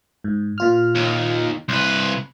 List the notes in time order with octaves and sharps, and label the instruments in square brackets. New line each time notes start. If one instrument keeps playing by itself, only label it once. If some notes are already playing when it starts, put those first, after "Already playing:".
[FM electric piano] G#2
A#2 F4 F6
[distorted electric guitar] D#2
[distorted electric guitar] C2 B4 [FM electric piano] C6